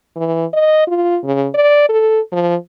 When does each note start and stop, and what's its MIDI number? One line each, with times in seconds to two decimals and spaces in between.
0.16 0.45 52
0.53 0.85 75
0.87 1.18 65
1.23 1.47 49
1.54 1.86 74
1.89 2.20 69
2.32 2.56 53